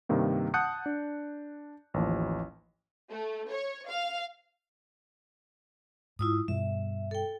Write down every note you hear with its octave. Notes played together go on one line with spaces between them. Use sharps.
G2 C3 D#3 A#3
F#5 A5 D#6 F#6 G6 C#7
D4
A1 D#2 F3
A3
C#5
F5
G#2 E4 F4 D#6
G2 B2 G3 E5
A4 G5